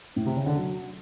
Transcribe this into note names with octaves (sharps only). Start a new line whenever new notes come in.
A2
C3
C#3
D3
F#3